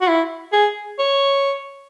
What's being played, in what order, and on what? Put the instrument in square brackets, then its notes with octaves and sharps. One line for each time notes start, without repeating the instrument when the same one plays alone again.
[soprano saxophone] F#4
E4
G#4
C#5